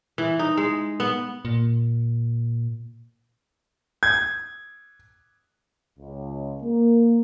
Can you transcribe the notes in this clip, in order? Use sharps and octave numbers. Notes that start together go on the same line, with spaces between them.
E3
D#4
G#3
B3
A#2
G#6
C#2
A#3